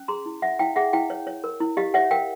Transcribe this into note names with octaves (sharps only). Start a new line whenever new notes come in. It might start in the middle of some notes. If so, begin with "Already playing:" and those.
Already playing: C#4
G#4 A#5 C6
E4
C#5 E5 F#5
E4 F5 G5
G#4 E5 F#5
E4 F5 G5
C#5
C#5
A#4
E4
G4 D#5 F5
C#5 E5 F#5
A#4 F5 G5